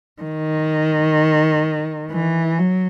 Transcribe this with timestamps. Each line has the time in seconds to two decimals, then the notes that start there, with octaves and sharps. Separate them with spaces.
0.22 D#3
2.12 E3
2.59 F#3